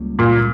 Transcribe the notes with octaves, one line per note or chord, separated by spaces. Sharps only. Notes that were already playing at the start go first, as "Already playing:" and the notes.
Already playing: C#2 C#3 G3 A#3
A#2